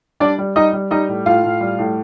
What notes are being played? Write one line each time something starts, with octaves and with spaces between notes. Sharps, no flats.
G3 D4 D5
G3
G3 D#4 D#5
G3
G3 D#4 D#5
A2
A2 F4 F5
A2
G3
A2